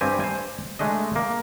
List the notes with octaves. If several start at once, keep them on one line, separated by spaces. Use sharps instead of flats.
G2 C4 G4 G#5
C5 G#5
G#3 A3 D4 D#5
A#3